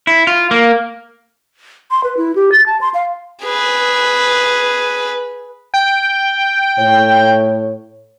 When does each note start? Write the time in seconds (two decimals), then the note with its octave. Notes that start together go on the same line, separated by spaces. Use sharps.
0.07 E4
0.27 F4
0.51 A#3
1.91 C6
2.04 B4
2.17 E4
2.36 G4
2.52 A6
2.66 A5
2.81 C6
2.94 F5
3.44 G#4 B4
5.74 G5
6.78 A2 C#5